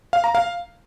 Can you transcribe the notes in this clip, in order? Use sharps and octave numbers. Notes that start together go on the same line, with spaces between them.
F5
A#5
F5